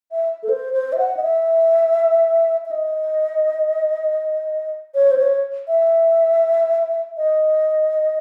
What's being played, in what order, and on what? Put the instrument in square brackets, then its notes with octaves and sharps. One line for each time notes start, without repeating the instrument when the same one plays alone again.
[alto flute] E5
A4
C5
C5
E5
F#5
D#5
E5
E5
D#5
C#5
C5
C#5
E5
D#5